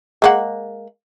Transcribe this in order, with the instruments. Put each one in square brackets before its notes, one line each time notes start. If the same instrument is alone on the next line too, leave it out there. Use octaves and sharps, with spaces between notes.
[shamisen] G#3 A#3 F#5